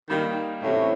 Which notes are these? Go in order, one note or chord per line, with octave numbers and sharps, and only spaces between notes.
D#3 G3 A#3 D#4
A2 C3 E3 A3 C#4